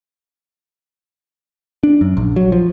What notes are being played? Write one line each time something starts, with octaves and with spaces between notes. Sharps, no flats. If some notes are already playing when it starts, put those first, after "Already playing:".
D4
F#2
A#1
F#3
F3